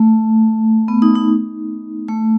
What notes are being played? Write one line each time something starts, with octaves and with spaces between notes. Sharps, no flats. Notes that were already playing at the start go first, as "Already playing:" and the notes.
Already playing: A3
B3
D#4
D#4
A3